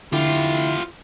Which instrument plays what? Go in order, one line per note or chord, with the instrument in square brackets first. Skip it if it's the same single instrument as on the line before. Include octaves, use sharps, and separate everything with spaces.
[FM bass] D3 [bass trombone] E4 [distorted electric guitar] F4 G4